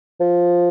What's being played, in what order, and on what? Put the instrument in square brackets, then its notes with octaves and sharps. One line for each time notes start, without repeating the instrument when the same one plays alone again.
[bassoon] F3